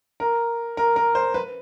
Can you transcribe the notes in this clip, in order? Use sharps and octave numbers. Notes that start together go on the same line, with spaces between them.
A#4
A#4
A#4
C5
B4